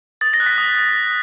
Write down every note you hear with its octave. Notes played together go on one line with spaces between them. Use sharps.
D#6 A6
A#6
F#6
B6
D#6